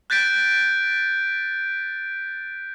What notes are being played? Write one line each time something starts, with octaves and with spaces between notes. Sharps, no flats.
F#6 G6 A6 B6 D7